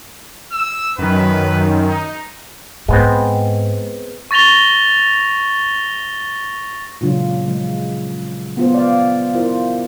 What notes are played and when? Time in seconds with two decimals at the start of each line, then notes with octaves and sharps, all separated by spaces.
0.52 E6
0.98 F#2 D#3 B4
1.88 D#4
2.88 G#2 G#3 B3 C4
4.31 C#6 A6 A#6 F7 G7
7.01 A#2 C#3 F#3 G#3 D4 F4
7.47 F3 G#3
8.57 B3 F4 C5
8.74 D5 F5
9.34 E4 F4 A#4 C5